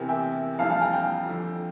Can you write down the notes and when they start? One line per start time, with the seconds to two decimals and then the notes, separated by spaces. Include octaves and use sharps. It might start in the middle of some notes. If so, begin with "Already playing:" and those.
Already playing: E2 C3 E3 G4 A#4
0.09 E5 G5
0.59 F2 E3 G3 F5 A5
0.70 F5 A5
0.81 G5 A#5
0.93 G5 A#5
1.26 F2 D3 F3